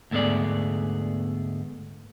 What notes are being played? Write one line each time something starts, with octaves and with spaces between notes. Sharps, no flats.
D2 G#2 A3 B3 G#4 D5